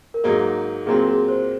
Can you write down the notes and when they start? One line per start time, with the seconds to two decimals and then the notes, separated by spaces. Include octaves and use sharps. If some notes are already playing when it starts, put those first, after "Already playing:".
0.14 A#4
0.24 G#2 F#3 A#3 D#4 G#4
0.86 A#2 F#3 C4 G#4
1.07 G#4
1.28 C5